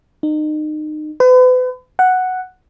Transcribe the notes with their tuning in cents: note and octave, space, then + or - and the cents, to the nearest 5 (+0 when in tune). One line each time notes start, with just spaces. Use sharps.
D#4 -30
B4 +40
F#5 +0